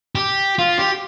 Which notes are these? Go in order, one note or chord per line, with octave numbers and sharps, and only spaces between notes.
G4
F4
G4